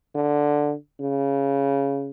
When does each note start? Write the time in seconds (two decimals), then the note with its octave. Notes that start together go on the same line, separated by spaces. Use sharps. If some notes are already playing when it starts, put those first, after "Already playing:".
0.15 D3
1.01 C#3